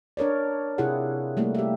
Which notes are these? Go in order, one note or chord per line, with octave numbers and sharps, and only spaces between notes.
D4 A#4 C#5 D5
C3 E4 F4 G4 G#4 F#5
G3 A3 A#3 E4
G4 E5